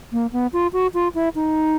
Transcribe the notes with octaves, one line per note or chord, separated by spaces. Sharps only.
A#3
B3
F4
F#4
F4
E4
D#4